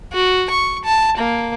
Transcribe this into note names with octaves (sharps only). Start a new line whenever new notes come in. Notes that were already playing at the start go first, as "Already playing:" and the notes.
F#4
C#6
A5
A#3